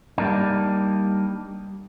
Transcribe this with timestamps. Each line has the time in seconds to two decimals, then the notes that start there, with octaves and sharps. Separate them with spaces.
0.18 G3 A#3 D4 D#4